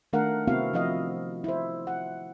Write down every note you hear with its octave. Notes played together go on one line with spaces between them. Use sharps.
D#3 A3 D4 A#4 F5 F#5
C3 B3 C4 E4 F#4 F5
F3 E4 D#5 F5
E4 C5
F#5